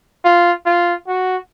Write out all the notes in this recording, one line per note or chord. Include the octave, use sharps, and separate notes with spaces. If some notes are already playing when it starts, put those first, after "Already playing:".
F4
F4
F#4